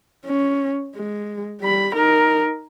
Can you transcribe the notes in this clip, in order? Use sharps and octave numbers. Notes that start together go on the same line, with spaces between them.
C#4
G#3
G3 B5
D#4 A#4